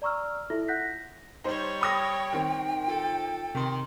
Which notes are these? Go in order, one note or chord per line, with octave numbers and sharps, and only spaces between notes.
D5 A#5 C#6 E6 F6
E4 F4 A4 E5
F4 F#5 F#6 G6 A#6 B6
G3 D#4 C5 C#5
G5 B5 D#6 A#6
D#3 C4
F4 A4
C3 D#3 C4 C6